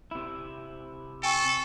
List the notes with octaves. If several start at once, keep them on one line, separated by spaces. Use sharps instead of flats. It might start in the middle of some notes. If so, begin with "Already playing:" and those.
C3 E4
A4 G5 G#5 C#6